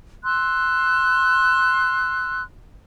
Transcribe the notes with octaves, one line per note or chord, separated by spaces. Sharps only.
C6 E6 F#6